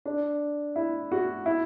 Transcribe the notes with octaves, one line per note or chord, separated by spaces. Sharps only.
D4
E4
F#4
E4